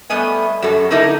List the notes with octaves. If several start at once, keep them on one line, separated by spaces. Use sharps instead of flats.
G3 A3 B3 D#5 G#5
F#2 F#3 G3 A4
D3 A#3 D#4 E4 A4 A#4